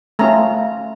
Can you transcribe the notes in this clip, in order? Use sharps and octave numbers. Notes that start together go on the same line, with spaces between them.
A3 C#4 F4 A#5